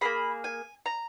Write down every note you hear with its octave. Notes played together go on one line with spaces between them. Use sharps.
A#3 C#4 G#4 B5
G#5
A#5